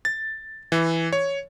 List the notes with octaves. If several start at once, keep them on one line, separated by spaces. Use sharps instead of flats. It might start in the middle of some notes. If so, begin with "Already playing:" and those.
A6
E3
C#5